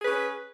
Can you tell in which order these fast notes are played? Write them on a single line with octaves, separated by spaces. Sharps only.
G#4 B4 C#4